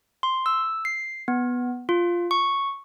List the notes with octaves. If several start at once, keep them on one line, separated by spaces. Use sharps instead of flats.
C6
E6
C7
B3
F4
C#6